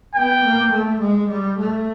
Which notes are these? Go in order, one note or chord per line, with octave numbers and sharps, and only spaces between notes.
B3 G5
A#3
A3
G#3
G3
A3